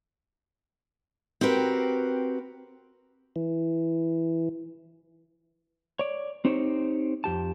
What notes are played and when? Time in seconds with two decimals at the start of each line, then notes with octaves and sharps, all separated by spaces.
1.41 C4 F#4 G4 A#4 B4
3.36 E3
5.99 C#5 D5
6.45 C4 D#4 G4 C5 C#5
7.24 F2 G4 A5